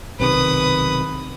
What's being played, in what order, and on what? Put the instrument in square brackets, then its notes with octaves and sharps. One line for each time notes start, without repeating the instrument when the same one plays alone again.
[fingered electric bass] B1 C3 D#3 [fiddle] B4 D#6